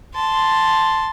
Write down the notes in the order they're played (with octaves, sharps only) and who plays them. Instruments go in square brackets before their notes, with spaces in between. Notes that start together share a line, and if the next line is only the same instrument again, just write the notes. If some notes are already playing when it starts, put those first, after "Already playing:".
[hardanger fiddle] A5 C6